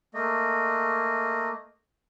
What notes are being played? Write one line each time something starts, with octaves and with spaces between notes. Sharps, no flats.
A3 A#3 D#5